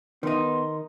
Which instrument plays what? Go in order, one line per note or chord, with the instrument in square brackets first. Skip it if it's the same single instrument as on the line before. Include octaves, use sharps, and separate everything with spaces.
[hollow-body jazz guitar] D#3 D#4 [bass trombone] B3 [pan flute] C6